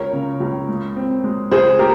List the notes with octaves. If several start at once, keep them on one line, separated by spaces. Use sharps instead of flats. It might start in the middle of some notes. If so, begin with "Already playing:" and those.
Already playing: C#2 A#4 C#5
C#3
C#2
G#3
C4
G#3
C#2 G#4 C5
A#3 G4 A#4